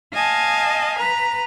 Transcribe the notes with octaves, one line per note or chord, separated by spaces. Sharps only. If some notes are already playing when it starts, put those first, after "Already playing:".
D#5 F5 G#5 A5
B4 A#5